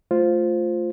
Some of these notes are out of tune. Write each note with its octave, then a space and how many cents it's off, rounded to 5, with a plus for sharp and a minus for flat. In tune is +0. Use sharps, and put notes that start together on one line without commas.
A3 +0 F4 +0 C5 +0